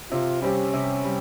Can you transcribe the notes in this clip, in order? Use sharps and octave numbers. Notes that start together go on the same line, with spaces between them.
C3 F4
G3 C4 C#4 G4
C3
G3